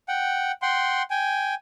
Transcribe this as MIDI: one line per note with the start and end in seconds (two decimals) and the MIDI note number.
0.08 0.52 78
0.08 0.52 79
0.62 1.03 78
0.62 1.03 79
0.62 1.03 84
1.10 1.54 79
1.10 1.54 80